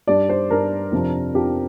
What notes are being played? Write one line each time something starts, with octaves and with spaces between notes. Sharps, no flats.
G2 G3 D4 D5
C5
G2 G3 D4 A#4
F2 C3 F3 D4
F2 C3 F3 D4 G4